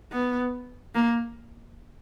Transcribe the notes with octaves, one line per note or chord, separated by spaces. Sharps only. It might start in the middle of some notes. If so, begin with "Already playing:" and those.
B3
A#3